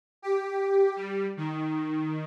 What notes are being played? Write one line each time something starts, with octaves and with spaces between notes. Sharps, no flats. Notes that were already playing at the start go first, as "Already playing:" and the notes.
G4
G3
D#3